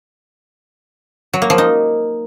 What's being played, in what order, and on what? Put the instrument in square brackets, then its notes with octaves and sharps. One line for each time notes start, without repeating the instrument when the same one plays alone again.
[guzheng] F#3
A#3
F3
D#4